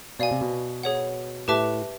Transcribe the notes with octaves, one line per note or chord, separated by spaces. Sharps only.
B2 D5 F5 G#5
C3
B2
G#4 C#5 F#5
A2 G4 B4 E5 A5 D6